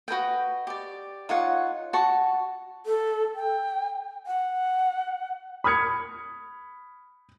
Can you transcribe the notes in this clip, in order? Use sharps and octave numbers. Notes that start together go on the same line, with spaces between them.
F#4 B4 D#5 G5
G4 D5
D#4 F4 C#5 F#5
F#4 A5 C#6
A4
G5
F#5
B5 D#6 F6 G#6 C#7